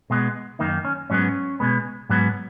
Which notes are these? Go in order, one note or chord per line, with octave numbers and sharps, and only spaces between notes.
B2 G#3 B3
F#2 D#3 A#3 D#4
C#4
G#2 F#3 B3 C#4
B2 G#3 B3
G#2 F#3 B3